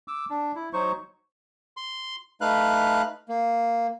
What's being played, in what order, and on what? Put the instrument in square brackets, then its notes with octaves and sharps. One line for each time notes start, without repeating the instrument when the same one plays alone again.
[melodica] D6 E6
D4
E4
F#3 D#4 C5 C#6
[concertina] C6
A3 D#4 B4 F5 F#6
A#3